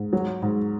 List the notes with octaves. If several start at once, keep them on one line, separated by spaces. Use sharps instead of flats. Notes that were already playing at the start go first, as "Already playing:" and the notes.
Already playing: G#2
F#3
G#2